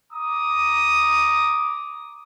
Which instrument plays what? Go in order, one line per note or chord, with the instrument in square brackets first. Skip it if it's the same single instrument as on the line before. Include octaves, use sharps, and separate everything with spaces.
[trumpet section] A#5 D6 D#6